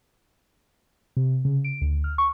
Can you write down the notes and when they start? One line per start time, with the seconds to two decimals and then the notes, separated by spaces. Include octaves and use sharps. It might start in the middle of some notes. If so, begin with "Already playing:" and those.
1.17 C3
1.45 C#3
1.65 D7
1.81 D2
2.04 F6
2.18 C#6